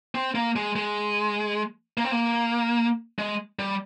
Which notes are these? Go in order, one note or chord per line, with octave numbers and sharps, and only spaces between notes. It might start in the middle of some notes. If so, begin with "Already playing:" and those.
C4
A#3
G#3
G#3
A#3
C4
A#3
G#3
G3